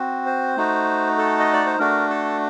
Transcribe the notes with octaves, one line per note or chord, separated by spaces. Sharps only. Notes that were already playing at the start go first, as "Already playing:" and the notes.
Already playing: C4 F#4
C5
A3 D#4 F#4
A4
D#5
D5
C5
A3 D4 F#4 A#4
A4